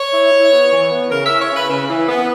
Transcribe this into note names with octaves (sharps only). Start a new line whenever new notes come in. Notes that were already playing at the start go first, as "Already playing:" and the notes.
Already playing: C#5
E4
E4
B3
E3
B3
C#3 A#4
E4 E5
C#5
C#3 B4
C#3
E3
B3